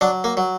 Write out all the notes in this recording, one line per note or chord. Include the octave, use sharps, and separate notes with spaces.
F#3 D4
A#3
F#3